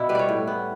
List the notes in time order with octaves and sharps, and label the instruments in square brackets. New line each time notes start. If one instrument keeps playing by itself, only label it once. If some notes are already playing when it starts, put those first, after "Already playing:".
Already playing: [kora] B2 B3 D4 E4
G3 B4
C#5 D5
A2
B3